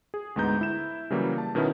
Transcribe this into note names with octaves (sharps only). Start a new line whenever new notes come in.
G#4
D2 G#2 G#3 B3 A#5 G6
E4 E7
C#3 E3 F#3 G3 A#3
A5
B2 D#3 B3 C#4 E4